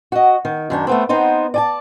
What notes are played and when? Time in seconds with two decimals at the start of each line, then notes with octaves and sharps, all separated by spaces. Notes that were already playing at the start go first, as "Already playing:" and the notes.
0.12 F#4 D#5
0.45 D#3
0.70 F#2 D#3 D4
0.87 A3 B3 C4
1.09 B3 C4 D#4 C5
1.54 D5 G#5 A5